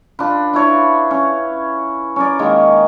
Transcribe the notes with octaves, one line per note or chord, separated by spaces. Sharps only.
D4 F4 B4
D4 E4 C#5
C#4
C#4 A#4 D5
D#3 G#3 A#3 A#4